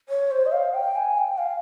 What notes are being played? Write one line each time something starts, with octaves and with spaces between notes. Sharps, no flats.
C#5
C5
D#5
F5
G5
G#5
G5
F5